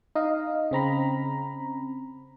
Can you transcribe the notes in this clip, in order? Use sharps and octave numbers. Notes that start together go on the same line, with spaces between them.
D#4 D#5 F5
C#3 C4 A#5 B5